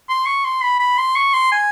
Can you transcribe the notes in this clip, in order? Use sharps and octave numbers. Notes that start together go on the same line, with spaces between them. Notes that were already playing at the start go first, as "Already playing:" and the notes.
C6
C#6
C6
B5
B5
C6
C#6
C6
G#5